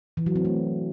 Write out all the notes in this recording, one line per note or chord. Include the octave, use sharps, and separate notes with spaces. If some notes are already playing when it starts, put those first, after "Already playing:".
E3
F#3
C4
A3